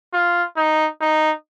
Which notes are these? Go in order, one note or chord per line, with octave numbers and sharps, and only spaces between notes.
F4
D#4
D#4